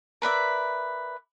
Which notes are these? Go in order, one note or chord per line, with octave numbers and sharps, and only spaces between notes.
A#4 B4 D5 E5